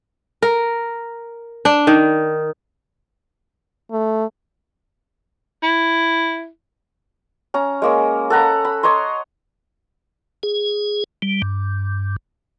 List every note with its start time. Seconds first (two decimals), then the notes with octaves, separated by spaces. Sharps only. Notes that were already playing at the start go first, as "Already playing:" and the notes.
0.42 A#4
1.65 D4
1.87 D#3
3.92 A3
5.63 E4
7.54 C#4 A#5
7.82 G#3 A#3 C#4
8.30 A4 F#5 A#5 B5
8.65 B5
8.83 C#5 D#5 A#5 C6
10.43 G#4
11.22 G3
11.42 G2